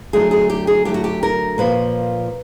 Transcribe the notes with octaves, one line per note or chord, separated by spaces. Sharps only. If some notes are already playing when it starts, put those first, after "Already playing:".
D3 F#3 A3 G#4
G#4
G4
G#4
D3 F#3 A3 G4
F#4
G4
A#4
A#2 F3 A#3 B4